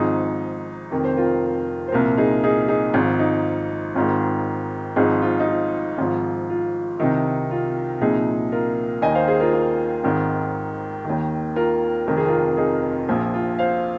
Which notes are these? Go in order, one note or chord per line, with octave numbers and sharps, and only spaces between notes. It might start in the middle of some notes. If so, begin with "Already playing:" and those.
Already playing: G#1 G#2 F3 D#4 G#4
F1 F2 D#3 A#4
C5
F4 A#4
C5
C2 A#2 F3 F4 A#4
D#4 G#4
D#4 G#4
D#4 G#4
G#1 G#2 F3 F4
D#4
G#1 G#2 D#3 F4
G#1 G#2 F3 D#4 G#4
F4
D#4
F4
G#1 G#2 F3
F4
C2 C3 D#3 D#4
F4
C2 A#2 F3 D#4 G#4
F4 A#4
D#2 D#3 D#5 G#5
C5 F5
G#4 C5
F4 A#4
F4 A#4
G#1 G#2 D#3
D#2 D#3
F4 A#4
F1 F2 D#3 A#4
G#4
F4 A#4
D#4 G#4
A#1 A#2 F3 F4
F4
C5 F5